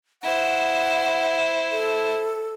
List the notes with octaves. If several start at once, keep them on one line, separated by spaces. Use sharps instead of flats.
E4 C5 F#5
A4